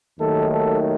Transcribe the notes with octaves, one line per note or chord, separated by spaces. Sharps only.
D#2 D#3 F#3 A3 A4
A4